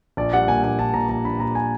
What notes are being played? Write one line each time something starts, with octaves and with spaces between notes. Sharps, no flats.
A#1 D5
G3 F#5
A#2 G#5
A#1 G#5
A#1 A5
A#2 A#5
A#1 A#5
A#1 B5
A#1 A#5
G#5